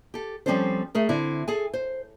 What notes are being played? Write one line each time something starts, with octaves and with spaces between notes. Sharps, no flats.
G4 A4
F3 G3 C4 C#4 A4 C5
A3 G#4 A#4
D3 C4 E4
G#4 A4 G#5
C5